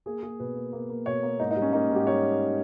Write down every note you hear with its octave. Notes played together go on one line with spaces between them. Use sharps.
A#3 G#4
A#3 G#4
B2 B4
A#3
A#3
A#3
B2 C#5
A#3
G#2 D#4
D#4
G3
C#4
A#3 D#4
G#2
G4
G3 C#5